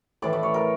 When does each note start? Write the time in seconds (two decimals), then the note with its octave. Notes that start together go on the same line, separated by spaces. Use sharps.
0.22 A2 E3 D5
0.33 D5
0.43 C#5
0.54 A#4